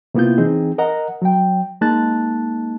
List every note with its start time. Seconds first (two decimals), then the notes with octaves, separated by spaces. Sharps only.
0.15 C3 A#3 B3 E4 F4 G6
0.38 E3 C4 D#4 G#4
0.78 A#4 D#5 F#5 A#5
1.22 F#3 G5
1.81 G#3 A#3 D#4 A5 F#6 A6